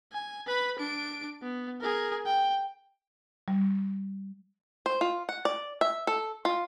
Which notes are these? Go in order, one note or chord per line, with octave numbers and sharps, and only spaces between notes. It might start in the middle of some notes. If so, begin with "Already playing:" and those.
G#5
B4 B5
D4 D7
B3
G#4 A#4
G5
G3
C5
F4
F#5
D5
E5
A4
F4